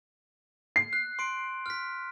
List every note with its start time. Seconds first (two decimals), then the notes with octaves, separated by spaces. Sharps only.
0.76 C7
0.93 F#6
1.19 C6 D7
1.66 F6 B6